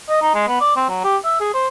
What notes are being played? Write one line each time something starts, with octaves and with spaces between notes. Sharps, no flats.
D#5
D#4
G#3
B3
D5
C4
F#3
G4
E5
G#4
C5